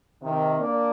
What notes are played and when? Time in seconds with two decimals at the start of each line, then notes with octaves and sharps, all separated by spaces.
0.21 C3 D#3
0.58 A#3 D4